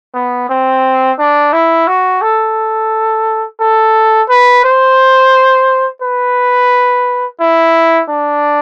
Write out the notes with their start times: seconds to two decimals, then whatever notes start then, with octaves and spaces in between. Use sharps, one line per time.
0.14 B3
0.49 C4
1.19 D4
1.53 E4
1.87 F#4
2.21 A4
3.60 A4
4.29 B4
4.64 C5
6.02 B4
7.40 E4
8.09 D4